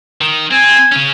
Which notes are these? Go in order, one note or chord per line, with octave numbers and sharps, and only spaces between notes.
D#3
C4 G#5
C#3 C#4